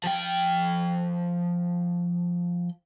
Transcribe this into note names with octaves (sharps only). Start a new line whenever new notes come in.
F3 G5